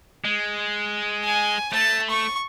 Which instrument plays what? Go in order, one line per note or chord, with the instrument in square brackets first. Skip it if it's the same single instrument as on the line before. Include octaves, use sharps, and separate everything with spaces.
[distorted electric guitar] G#3
[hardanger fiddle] G#5
[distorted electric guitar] A3 [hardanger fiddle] A5
[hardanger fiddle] C#6